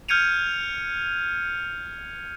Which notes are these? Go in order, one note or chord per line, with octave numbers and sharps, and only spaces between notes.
F6 G6 G#6 C#7 D#7 F7